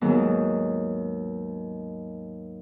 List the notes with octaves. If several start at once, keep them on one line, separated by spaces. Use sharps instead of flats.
D#2 G#2 D#3 F#3 B3 F#4